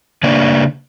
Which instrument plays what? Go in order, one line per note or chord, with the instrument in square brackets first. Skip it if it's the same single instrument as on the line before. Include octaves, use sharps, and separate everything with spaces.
[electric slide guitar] C#3 A#3 D4 D5